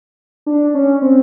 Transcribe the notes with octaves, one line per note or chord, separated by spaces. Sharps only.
D4
C#4
C4